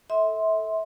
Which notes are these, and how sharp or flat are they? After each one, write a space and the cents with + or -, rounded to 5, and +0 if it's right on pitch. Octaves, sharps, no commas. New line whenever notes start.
A4 +0 E5 -30 C6 +0